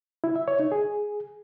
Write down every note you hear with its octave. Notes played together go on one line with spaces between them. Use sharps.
E4
E5
C#5
D#4
G#4